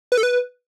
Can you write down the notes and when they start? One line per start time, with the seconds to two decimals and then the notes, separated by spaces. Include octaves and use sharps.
0.12 B4
0.17 A4
0.23 B4